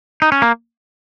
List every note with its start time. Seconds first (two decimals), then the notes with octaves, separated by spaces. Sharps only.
0.22 D#4
0.32 C#4
0.42 A#3